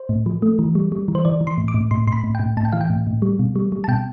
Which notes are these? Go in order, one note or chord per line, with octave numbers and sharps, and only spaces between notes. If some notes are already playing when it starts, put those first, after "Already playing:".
Already playing: C5
A2
F3
A3
E3
G3
G3
E3
C5
E3 D5
E3
C6
A2
D6
A2
A2 C6
A2 C6
B5
A2
A2 G5
A2 A5
G5
E3 F5
G5
A2
A2
G3
B2
G3
G3
A5
B2 G5